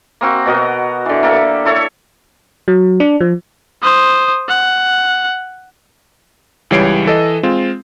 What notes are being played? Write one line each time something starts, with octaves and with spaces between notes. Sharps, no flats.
A#3 C4 F#4
B2 F#4 A#4 D#5
D3 E3
A#3 G4 A4
E4 A4 C#5 E5
F#3
D4
F3
C5 D#6
F#5
C#2 E3 G3 C#5 C7 D7
E3 A4 D#5
G#3 C4 F4